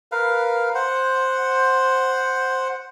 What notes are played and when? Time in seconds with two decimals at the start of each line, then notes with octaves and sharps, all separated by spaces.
0.12 A#4 B4 F5
0.75 C5 F#5